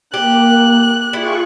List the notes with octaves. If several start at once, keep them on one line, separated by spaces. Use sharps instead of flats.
A#3 G4 F#6
E4 F4 G4 G#4 C#6